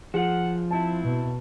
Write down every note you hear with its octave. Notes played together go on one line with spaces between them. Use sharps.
F3 G#4 F#5
C4 E4 A5
B2